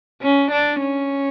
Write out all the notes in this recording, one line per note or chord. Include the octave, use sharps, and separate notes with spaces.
C#4
D4
C#4